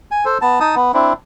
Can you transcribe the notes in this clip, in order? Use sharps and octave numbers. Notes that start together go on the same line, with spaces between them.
G#5
A4 C5
B3 A5
D#4 A5 D#6
B3
C4 D4 E4